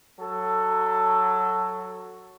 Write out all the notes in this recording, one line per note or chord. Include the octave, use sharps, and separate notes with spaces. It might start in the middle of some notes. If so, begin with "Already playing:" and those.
F#3 A4